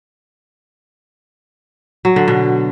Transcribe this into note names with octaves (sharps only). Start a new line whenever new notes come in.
F#3
D3
B2